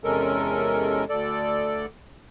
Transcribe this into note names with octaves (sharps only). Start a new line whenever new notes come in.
E2 C3 G#3 C#4 A4 A#4
D2 A4 D5